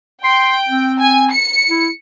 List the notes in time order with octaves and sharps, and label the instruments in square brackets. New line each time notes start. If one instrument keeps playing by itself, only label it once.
[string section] G5 [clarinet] C6
[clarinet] C4
[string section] G#5
C#7
[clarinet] E4